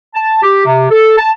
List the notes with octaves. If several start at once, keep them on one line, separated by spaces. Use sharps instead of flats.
A5
G4
C3
A4
A5